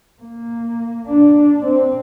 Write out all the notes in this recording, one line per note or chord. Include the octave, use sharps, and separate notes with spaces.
A#3
D4
C4